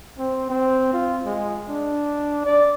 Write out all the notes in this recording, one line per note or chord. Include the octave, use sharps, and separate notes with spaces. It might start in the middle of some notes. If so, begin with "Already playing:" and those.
C4
C4
F4
G#3
D4
D5